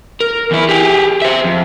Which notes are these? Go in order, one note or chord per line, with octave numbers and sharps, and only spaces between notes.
A#4
E2 E4
G4 G#4
C5 E5
F2